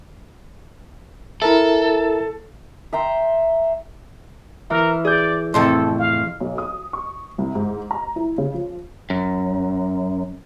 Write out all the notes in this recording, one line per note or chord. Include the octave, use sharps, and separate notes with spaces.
E4 A4 A#4 E5
E5 G5 A#5 C6
E3 A#4
G#4 D5 G6
F2 A2 C3 A4 C6
F5
B1
D#6
C#6
C2
G#2
A#5
E4
C#3
F3
F#2